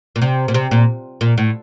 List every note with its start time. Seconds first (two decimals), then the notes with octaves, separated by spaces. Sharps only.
0.16 A#2
0.22 C3
0.48 A#2
0.54 C3
0.71 A#2
1.21 A#2
1.38 A2